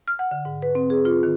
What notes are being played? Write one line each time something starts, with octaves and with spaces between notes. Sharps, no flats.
F6
F#5
D3
G#2
B4
C4
G#4
F4
D#3